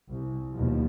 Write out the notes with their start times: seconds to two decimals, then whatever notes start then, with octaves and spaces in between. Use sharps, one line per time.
0.11 C2
0.54 D#2 B2 F3